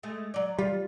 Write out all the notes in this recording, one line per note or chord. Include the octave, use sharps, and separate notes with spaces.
G#3 A3
F#3 D5
G3 F4